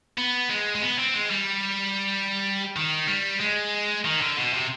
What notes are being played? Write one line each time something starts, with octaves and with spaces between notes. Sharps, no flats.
B3
G#3
G#3
B3
C4
G#3
G3
D#3
G3
G#3
D#3
D3
B2
C3